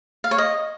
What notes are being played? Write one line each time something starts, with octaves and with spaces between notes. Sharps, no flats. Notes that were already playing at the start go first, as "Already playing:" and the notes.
F5
C#5
D#5